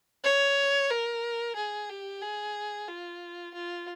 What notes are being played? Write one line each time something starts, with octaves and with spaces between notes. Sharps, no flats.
C#5
A#4
G#4
G4
G#4
F4
F4